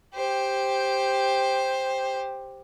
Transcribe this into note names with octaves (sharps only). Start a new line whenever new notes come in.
G4 C5